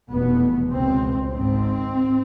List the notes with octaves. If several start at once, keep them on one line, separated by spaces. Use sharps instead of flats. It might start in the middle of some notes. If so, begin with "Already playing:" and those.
F1 E2 B2 B3
C#2 B2 C4
G#1 G#2 C4